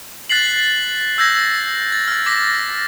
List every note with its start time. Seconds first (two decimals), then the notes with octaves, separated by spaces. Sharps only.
0.30 F#6 A6 B6 C7 F#7
1.18 E6 G6 G#6 A#6 B6
1.92 A6
2.08 F6 A6
2.26 D6 A#6 B6